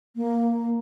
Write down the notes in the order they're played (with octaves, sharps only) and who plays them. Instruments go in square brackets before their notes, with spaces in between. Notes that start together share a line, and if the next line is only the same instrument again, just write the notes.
[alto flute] A#3